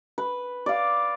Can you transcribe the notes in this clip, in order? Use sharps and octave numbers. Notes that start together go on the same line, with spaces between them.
B4
D5 F5